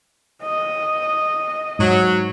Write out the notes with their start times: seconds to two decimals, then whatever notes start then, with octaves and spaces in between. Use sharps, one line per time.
0.43 D#5
1.79 G#2 F#3